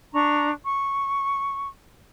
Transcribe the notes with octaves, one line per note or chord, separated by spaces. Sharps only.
D4 A#5 C#6
C#6